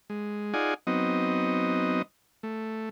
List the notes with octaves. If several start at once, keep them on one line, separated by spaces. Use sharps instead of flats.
G#3
D#4 F4 G#4 D5 F#5 G#5
F#3 B3 C4 D#4 D#5
A3